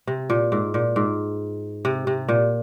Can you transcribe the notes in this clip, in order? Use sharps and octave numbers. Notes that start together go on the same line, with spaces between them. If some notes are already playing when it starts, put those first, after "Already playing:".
C3
A#2
G#2
A#2
G#2
C3
C3
A#2